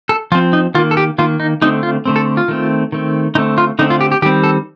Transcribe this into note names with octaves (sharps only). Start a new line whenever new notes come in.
A4
F3 C4 F4
D#4
D#3 A#3 F4
A4
G4
D#3 A#3 F4
D#4
D3 A3 C4 D#4
F4
D3 A3 C4
A4
F4
D#3 A3 C4
D#3 A3 C4
D3 A3 C4 D#4
F4
D3 A3 C4 D#4
F4
G4
G4
D#3 G3 C4 G4
A4